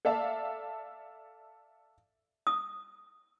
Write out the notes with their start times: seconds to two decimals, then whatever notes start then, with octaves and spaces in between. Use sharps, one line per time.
0.05 A4 D5 E5 F5 A5
2.47 D#6